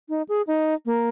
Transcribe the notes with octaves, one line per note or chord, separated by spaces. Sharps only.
D#4
G#4
D#4
A#3